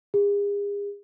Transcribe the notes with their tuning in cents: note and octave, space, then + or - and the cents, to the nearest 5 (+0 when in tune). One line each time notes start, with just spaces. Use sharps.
G#4 -40